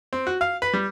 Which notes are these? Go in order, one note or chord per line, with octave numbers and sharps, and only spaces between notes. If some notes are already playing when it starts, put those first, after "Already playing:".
C4
F#4
F5
B4
G3